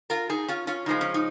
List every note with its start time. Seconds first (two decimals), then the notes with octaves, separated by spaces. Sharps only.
0.10 F4 A#4
0.30 D#4 G#4
0.48 C#4 F4
0.67 C#4 F4
0.86 C#3 F3 G#3 D#4
1.01 C#4
1.14 D#4